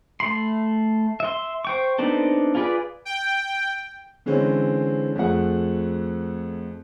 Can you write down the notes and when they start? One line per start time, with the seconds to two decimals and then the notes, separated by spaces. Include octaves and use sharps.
0.20 A3 B5 C6
1.20 E5 C6
1.65 C5 G5 C#6
1.98 B3 C4 D4 D#4 A4
2.55 F4 G#4 B4 D5
3.05 G5
4.26 D3 E3 G#3 C4 C#4
5.15 F2 A3 G#4 F#5